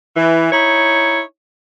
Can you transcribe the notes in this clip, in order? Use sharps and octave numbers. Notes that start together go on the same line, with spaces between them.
E3
D#4 E4 C#5